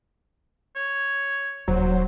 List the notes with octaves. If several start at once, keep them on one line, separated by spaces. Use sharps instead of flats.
C#5
D#1 F#3 C5